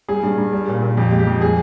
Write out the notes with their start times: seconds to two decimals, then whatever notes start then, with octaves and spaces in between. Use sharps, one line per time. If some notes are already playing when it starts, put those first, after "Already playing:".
0.08 G3 G#4
0.23 G2
0.38 G2
0.52 G3
0.68 A#2
0.82 A#2
0.97 F2 G4
1.12 G#3
1.19 G4
1.27 F2
1.41 G3 G#4